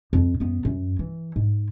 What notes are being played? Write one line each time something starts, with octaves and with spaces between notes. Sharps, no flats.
F2
F#2 B3
F#2
E3
G#2